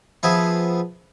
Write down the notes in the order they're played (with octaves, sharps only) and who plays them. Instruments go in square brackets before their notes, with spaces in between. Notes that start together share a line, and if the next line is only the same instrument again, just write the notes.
[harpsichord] F3 B3 G#4 E5